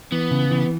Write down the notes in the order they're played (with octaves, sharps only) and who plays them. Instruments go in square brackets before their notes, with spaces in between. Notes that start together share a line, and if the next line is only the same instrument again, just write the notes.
[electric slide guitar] E3 [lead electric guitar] B3
[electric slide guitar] C#3
E3